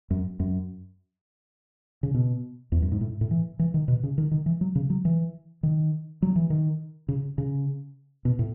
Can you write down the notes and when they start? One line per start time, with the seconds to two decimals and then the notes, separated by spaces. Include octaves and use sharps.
0.11 F#2
0.40 F#2
2.03 C#3
2.14 B2
2.72 E2
2.82 F#2
2.92 G#2
3.01 A2
3.21 A2
3.31 E3
3.59 E3
3.74 D#3
3.88 B2
4.03 C#3
4.18 D#3
4.31 D#3
4.46 E3
4.61 F#3
4.75 C#3
4.90 F#3
5.05 E3
5.63 D#3
6.22 F#3
6.36 E3
6.50 D#3
7.08 C#3
7.38 C#3
8.25 B2
8.39 A2